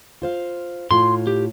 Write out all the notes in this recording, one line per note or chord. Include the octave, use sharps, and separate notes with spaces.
F4 C5 F5
A2 F4 C6
G4